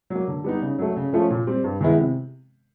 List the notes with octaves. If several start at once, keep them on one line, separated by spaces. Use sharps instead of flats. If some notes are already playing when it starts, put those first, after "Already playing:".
F#3 A#3
D3
G3 B3 D#4
C#3
F#3 A3
C#3
F3 A3 C#4 F4
A#2
G3 C4
G2
D#3 G#3 B3 E4
C3